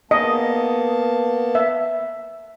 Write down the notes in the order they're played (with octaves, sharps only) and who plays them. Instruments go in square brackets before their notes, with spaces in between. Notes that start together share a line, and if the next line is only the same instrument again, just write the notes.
[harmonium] A#3 B3 A5 [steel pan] D#5
[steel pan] E5